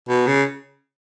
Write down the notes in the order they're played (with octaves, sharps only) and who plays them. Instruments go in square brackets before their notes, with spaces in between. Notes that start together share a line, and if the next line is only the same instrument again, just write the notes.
[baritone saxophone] B2
C#3